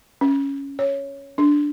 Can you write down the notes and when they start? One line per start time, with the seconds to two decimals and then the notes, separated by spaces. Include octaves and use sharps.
0.21 C#4
0.79 C#5
1.38 D4